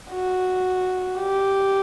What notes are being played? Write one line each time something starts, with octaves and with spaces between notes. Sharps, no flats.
F#4
G4